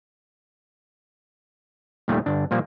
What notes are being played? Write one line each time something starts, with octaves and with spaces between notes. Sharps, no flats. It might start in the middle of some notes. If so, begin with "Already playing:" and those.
D#2 A#2 D#3 G3 A3
G1 D4
A#2 F3 G3 A#3